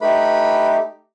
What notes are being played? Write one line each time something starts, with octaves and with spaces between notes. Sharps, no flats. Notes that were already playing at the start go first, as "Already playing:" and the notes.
A3 D#4 G4 B4 B5